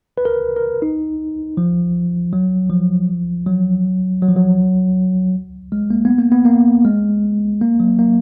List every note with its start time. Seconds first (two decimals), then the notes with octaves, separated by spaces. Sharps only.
0.18 B4
0.25 A#4
0.56 A#4
0.82 D#4
1.57 F3
2.33 F#3
2.70 F3
3.46 F#3
4.22 F#3
4.29 F3
4.36 F#3
5.72 G#3
5.90 A#3
6.05 B3
6.18 A#3
6.32 B3
6.45 A#3
6.85 G#3
7.61 A#3
7.80 F#3
7.99 A#3